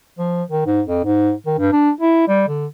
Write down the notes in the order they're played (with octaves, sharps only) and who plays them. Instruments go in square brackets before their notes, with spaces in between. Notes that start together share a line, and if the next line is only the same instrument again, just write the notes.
[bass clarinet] F3
D#3
G#2
F2
G#2
D#3
G2
D4
E4
G3
D3